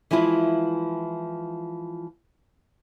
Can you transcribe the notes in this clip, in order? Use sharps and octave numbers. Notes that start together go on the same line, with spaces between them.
E3 F3 G#3 E4 F4